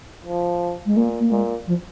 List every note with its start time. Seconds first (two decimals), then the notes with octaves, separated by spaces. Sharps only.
0.25 F3
0.85 G#3
0.96 A#2 A#3
1.19 A#3
1.31 A#2 G#3
1.67 F3